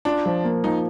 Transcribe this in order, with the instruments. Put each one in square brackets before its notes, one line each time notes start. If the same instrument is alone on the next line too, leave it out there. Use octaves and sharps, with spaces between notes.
[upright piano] D4 [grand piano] F4
[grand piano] F3
A#3
[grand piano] F3 [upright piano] D#4